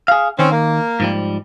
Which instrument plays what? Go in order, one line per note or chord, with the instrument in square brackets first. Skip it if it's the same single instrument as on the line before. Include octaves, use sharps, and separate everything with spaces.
[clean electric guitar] G#4 F5
[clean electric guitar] D#3 [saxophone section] C4 C#4
[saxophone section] A#3
[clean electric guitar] G#2 F3 G3